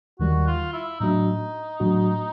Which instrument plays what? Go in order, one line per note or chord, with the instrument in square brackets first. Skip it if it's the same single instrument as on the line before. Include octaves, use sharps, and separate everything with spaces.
[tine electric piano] D#2 D#3 G3 [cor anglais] F#4
[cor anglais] F4
E4
[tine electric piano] A2 F#3 A3 D4 F#4 [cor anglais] D#4
[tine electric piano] A2 F#3 A3 D4 F#4